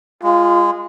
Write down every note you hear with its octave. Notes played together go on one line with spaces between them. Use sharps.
G#3 F4